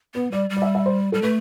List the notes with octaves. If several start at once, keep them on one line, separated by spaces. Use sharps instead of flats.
B3 B4
G3 D5
G3
D5
E5
E5
C5
G3 A4
A3 B4